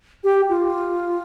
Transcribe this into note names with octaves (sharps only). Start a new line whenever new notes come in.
G4
F4